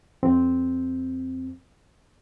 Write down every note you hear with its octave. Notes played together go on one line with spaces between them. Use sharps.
F2 C4